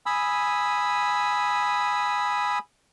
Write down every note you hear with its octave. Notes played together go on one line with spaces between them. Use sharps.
G#5 B5 D#6 E6